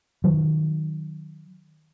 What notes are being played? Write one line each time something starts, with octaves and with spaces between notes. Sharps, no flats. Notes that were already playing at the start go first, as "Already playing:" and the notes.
D#3 F#3